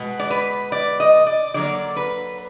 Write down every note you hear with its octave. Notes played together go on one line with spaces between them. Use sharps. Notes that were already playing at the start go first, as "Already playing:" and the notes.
Already playing: B2 G#3 B3
D5
B4
D5
D#5
D5
D3 F#3 A#3 D5
B4